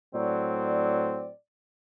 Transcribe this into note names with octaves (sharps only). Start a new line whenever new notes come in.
A2 F#3 C4 D5